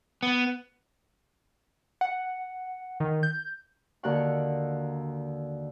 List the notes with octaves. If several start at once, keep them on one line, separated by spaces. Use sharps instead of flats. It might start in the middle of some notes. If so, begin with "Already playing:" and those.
B3
F#5
D#3
G6
D#2 D3 F#4 A#4 F#5 C#6